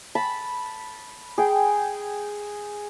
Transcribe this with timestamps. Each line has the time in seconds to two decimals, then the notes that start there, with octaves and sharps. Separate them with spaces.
0.15 A5 B5
1.38 G#4 G5